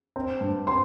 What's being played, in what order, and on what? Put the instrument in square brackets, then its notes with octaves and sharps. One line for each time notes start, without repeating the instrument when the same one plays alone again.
[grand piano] C4
G2
[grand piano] C4 [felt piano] C6